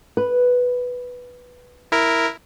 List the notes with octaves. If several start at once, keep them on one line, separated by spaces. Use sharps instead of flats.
B4
E4 A#4